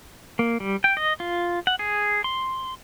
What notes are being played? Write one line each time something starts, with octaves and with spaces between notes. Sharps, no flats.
A#3
G3
G5
D#5
F4
F#5
G#4
C6